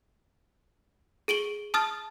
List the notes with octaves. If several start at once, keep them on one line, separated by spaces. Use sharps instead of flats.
G#4 D7 F#7 G7
A5 D#6 F6 A6